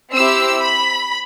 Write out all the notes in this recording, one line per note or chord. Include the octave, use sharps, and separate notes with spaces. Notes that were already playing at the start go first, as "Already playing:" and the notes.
C4 E4 G4 E6
B5